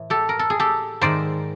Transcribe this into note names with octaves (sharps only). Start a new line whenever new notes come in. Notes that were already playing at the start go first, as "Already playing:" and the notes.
Already playing: A2 E3
G4 A4
A#4
A4
G#4
G4 A4
G#2 D#3 C5 D5